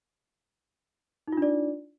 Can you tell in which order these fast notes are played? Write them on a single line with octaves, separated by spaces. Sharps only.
D#4 F4 D4 D5